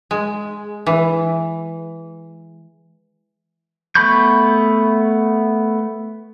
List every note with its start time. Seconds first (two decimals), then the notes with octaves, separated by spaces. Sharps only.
0.11 G#3
0.87 E3
3.95 A3 B3 B5 C#6 G6